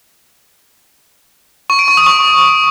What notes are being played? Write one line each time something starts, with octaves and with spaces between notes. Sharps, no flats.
C#6
D7
C#6
D#6
C#6